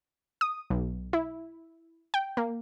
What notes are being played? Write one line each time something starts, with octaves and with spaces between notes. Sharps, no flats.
D#6
B1
E4
G5
A#3